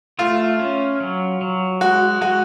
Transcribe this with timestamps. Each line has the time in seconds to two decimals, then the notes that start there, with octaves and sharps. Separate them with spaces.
0.19 A3 F4
0.59 C#4
1.00 F#3
1.41 F#3
1.81 G#3 F#4
2.21 G#3 F#4